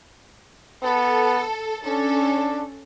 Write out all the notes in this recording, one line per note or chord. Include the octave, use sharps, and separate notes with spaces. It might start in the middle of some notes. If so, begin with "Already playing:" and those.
B3 A4
C#4 D4 A4